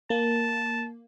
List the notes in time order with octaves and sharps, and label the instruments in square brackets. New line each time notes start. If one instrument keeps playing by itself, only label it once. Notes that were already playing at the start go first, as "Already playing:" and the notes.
[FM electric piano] A#3 [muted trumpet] A5